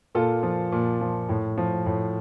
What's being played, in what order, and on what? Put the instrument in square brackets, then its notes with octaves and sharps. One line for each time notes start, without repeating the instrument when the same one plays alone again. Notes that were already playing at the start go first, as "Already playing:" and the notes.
[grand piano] A#2 F4 A4
F3
A#2
F3
A2
F3
A2